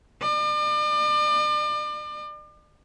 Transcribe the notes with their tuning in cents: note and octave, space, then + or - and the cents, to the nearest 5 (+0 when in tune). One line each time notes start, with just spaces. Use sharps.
D5 +40